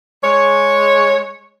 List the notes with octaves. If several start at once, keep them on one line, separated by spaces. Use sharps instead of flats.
G#3 C#5